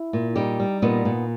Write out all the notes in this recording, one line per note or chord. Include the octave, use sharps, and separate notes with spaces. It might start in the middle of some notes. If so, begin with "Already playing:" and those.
Already playing: E4
A#2
G3 D#4 G4
G3
A#2 B3 D#4
A#2